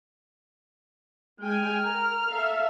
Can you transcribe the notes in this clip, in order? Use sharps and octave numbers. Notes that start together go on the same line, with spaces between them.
G#3 G5 G#5 F6
A#4 A#5
A4 E5 F5